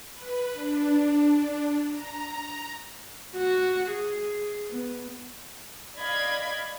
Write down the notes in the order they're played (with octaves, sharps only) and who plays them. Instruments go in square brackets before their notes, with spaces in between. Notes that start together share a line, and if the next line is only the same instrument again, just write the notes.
[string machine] B4
D4
A#5
[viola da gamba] F#4
G#4
B3
[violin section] D5 D#5 F5 B5 G#6